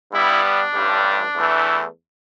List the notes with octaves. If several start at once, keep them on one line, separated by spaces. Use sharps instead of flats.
G2 G3 B3 E4
D4
A1 G2 G3
E2 E3 A3